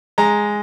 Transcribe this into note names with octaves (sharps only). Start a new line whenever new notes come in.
G#3 A#5